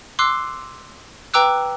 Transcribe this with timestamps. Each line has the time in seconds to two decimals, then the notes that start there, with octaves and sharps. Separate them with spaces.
0.19 C6 D6 E6 F#6 C7
1.34 B4 G5 A#5 D6 E6 F#6